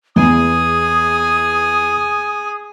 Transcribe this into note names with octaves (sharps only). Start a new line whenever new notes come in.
E2 E3 G#4 G#5 D#6